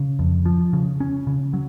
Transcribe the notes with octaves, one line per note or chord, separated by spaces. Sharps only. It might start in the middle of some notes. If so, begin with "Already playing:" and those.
Already playing: C#3
F2
F3
C#3
C#4
C#3
F#3